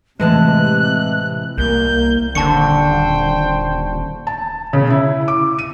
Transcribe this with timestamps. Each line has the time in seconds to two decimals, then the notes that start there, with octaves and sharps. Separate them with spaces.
0.20 A2 C3 E3 G#3 A5 F#6
1.58 C2 A#3 G6
2.35 D#1 D3 C5 G5 A5 C#6 C#7
4.27 A5
4.73 C#3
4.90 E4
5.28 D6
5.59 D#7